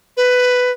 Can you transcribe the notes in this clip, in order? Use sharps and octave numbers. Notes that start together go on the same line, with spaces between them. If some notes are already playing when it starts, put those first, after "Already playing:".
B4